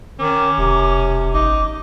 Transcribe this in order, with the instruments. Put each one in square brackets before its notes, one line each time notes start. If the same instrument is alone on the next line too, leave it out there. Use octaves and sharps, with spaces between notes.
[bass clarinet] D#3 [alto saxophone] C#4 [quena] D6
[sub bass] E1 [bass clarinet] C3
[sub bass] G#1 [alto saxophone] D#4 [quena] D6